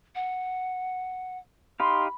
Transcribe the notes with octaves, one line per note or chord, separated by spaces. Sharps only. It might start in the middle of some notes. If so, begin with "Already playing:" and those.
F#5
D#4 G4 F5 B5 C6